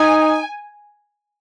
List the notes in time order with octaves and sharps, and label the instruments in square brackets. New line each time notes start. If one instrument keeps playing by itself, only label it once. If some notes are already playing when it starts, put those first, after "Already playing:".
Already playing: [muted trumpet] D#4 [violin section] G#5